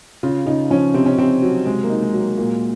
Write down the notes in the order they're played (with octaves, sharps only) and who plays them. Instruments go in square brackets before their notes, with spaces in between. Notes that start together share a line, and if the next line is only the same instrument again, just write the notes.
[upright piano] C#3 [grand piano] F4
[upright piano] C#3 [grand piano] D#4
[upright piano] F3 [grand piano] C#4
[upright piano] C3 [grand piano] C4
[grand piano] C#4
[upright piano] C3 [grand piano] C4
[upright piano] F#3
[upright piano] C3 [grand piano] G#3
[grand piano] A#3
[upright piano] D#4
[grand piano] G#3
[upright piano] F#3
[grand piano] A#3
[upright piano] A#2 [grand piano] A#3